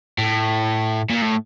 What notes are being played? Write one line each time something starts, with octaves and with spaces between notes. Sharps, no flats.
A2
A#2
A2